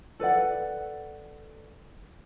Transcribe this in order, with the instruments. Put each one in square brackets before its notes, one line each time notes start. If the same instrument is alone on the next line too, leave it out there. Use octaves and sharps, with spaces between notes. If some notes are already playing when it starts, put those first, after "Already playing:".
[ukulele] A4 B4 D5 F#5